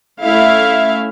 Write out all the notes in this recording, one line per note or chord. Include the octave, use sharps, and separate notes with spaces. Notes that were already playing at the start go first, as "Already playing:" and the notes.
A3 C#4 E4 E5 F5